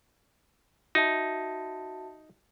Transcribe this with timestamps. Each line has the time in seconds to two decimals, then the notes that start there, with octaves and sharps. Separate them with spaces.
0.95 D#4 F#4 E5 A5